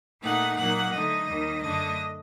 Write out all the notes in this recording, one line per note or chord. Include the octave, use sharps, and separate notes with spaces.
A#2 A3 D#4 F#5
A#2 F#3 A#3 D#4 F#5
D3 A3 D#4 D#5
D#2 D#3 G3
F#2 D3 A3 D4 D#5